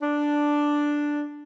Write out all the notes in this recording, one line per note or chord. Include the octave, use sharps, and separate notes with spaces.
D4